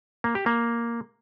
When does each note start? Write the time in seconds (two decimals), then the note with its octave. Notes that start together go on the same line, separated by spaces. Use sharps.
0.24 A#3
0.35 G4
0.46 A#3